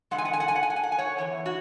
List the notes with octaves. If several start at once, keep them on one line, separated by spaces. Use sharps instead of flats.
E2 E3 G#3 F#5 G#5
F#5
G#5
F#5
G#5
F#5
G#5
F#5
G#5
F#5
G#5
C#5 F#5
E2 E3 C#5
F#4